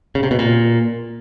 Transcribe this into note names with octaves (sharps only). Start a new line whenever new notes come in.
C#3
C3
B2
A#2